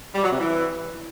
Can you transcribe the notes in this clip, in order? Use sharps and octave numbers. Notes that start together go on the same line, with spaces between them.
G3
F#3
C3
E3